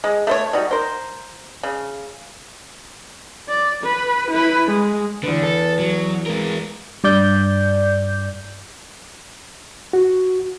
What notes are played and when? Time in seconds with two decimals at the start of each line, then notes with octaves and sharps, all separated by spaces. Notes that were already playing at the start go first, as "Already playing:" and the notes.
0.04 G#3
0.27 A3 C5 C#5
0.53 G3 D#4 F#4
0.71 A#4 C5
1.63 C#3
3.48 D5
3.84 B4
4.31 E4 B4
4.66 G#3
5.23 E2 D3 B4
5.43 A4
5.79 F#3
6.26 G#3 A#4
7.04 G2 D5 G6
9.93 F#4